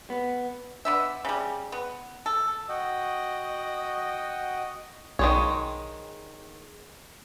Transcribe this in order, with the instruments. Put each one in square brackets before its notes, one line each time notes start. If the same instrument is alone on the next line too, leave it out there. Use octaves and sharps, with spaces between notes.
[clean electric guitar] B3
[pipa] B3 D4 E5
C#3 G3
B3
A4
[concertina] F#4 F#5 G5 [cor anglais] D#5
[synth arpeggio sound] B1 [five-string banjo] D#3 G#3 C#5